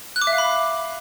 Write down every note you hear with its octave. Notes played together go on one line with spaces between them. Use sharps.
F#6
D6
E5
F5
B5